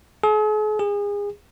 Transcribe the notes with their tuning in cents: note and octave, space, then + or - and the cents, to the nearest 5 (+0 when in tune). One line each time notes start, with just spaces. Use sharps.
G#4 +45
G#4 -30